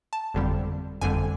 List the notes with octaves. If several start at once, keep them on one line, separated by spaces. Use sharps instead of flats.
A5
G1 F2 D3 G3
G1 F2 D3 G3 G#5